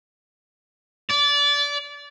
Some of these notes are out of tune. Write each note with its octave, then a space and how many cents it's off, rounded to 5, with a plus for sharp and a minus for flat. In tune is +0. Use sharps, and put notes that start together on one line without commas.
D5 -25